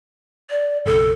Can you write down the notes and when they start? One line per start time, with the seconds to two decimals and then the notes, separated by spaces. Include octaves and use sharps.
0.50 D5
0.86 F#1 B1 A4